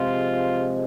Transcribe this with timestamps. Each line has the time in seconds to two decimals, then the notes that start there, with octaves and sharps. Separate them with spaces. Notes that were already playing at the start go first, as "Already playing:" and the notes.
Already playing: C3 F3 G#3 F4